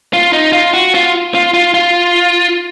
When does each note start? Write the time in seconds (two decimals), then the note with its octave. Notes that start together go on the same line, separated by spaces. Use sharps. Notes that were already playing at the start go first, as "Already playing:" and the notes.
0.13 F4
0.33 D#4
0.53 F4
0.74 F#4
0.94 F4
1.35 F4
1.54 F4
1.74 F4